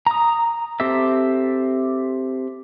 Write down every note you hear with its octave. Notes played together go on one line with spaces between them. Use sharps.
A#5 D#6
C4 G4 A4 E5